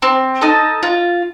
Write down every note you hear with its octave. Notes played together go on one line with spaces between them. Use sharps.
C4
D#4 A4 D#5
F4